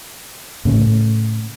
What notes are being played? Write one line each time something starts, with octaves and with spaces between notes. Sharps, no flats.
A2 C#3 A3